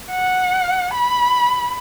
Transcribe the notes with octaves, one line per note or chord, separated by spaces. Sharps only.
F#5
B5